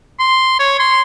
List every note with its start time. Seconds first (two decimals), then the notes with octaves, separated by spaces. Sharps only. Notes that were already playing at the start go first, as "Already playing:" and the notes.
0.19 C6
0.60 C#5
0.80 C6